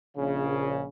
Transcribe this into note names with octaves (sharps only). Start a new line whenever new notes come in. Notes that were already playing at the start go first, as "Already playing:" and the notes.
A#1 C#3